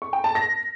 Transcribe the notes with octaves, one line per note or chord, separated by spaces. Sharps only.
C#6
G5
A5
A#6